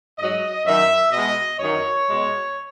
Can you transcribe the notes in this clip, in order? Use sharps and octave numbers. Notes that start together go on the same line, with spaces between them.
G#2 F#3 D#5
F#2 D#3 F#3 E5
B2 G#3 D#5
F#2 D#3 F#3 C#5
B2 G#3